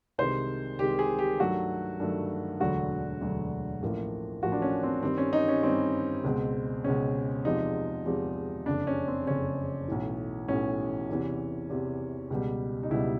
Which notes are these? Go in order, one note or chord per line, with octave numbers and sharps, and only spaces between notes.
C2 C3 D#3 G#3 C5
C2 C3 D#3 G#3 G4
G#4
G4
G2 D#3 F#3 A3 F#4
G2 D#3 F#3 A3
E1 D2 D3 F#3 F#4
E1 D2 D3 F#3
A1 A2 F3 A#3
A1 A2 F3 A#3 F#4
D4
C#4
C4
G2 D#3 G3 C4
C#4
D#4
C#4
G2 D#3 G3 C4
C#2 B2 G#3
C#2 B2 G#3 C#4
E2 C3 F3 G#3 D#4
E2 C3 F3 G#3
F#1 F2 C#3 D4
C#4
C4
F#1 F2 C#3 C#4
B1 A2 E3
B1 A2 E3 C#4
E2 C3 E3
E2 C3 E3
C#2 B2 G3
D#4
C#2 B2 G3 E4